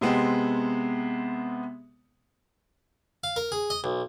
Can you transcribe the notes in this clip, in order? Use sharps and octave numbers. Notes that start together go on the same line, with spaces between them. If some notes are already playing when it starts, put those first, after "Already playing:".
C3 G#3 B3 C4
F5
A#4
G#4
D#5
B1